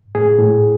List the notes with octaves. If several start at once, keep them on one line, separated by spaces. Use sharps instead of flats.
A2 G#4
A2